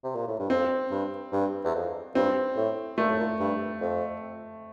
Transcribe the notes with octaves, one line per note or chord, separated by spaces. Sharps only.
C3
A#2
A2
G2
F2 C4
G2
G2
E2
F2
G2 C4
A2
A#2 A3
A2
A#2
G2
F2